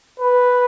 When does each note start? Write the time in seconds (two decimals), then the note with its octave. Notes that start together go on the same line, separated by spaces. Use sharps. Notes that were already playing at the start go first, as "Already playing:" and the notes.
0.19 B4